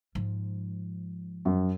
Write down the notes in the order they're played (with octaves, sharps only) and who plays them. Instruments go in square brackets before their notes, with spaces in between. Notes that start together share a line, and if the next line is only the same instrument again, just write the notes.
[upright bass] G#2 F3
[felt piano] F#2